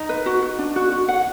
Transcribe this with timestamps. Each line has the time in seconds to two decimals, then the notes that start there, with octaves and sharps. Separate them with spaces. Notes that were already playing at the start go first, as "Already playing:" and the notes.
Already playing: D#4
0.09 B4
0.26 F#4
0.42 F#4
0.59 D4
0.76 F#4
0.92 F#4
1.08 F#5